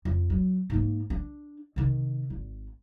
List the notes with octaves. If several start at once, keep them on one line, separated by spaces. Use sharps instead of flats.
F2
F#3
G#2 A#3
D4
C3 D#3
G#1